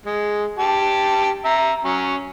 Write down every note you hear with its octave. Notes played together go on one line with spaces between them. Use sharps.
G#3
G4 A5
E5 A#5
F#3 C#4